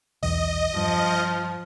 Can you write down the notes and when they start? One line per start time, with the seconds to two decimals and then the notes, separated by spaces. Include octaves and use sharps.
0.23 B1 E2 D#5
0.76 G2 F3